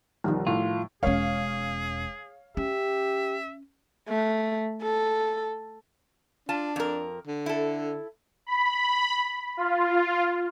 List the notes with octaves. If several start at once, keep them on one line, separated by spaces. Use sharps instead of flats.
B1 D#3 F3 G3
A2 F4
E1 C#4 G#4 C#5 F5
C#4 G4 E5
A3
A4
D4 F4 A5
F2 A#4
D3
E4 A4
B5
F4